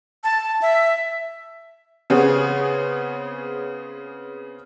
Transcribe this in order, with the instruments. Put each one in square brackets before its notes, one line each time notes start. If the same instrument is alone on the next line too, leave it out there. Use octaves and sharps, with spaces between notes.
[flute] A5
E5
[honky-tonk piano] C#3 B3 C4 G#4 C#5